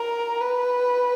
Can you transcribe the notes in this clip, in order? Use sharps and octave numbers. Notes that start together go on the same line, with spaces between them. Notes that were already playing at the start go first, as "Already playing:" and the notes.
Already playing: A#4
B4